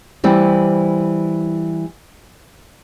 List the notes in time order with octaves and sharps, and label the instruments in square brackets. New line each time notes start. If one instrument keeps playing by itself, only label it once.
[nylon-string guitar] E3 G3 C4